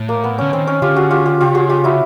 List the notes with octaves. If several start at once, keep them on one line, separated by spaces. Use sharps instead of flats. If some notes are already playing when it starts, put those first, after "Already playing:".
Already playing: A2
A#3
B3
D3 C#4
D#3 C4
C#4
D3 F4 G4
F#4 G#4
F4 G4
F4 G4
C#3 F4 G4
F#4 G#4
F4 G4
E4 F#4